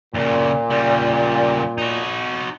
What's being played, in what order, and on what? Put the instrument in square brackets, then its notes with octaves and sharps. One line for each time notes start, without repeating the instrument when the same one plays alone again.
[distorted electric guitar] D#2 C#3 [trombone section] A#2
[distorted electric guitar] C#3 G3
D#4 F#4